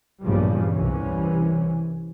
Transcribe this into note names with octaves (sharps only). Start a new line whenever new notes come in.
A#1 E2 G2 C#3 F3 G3
C2 E3 C#4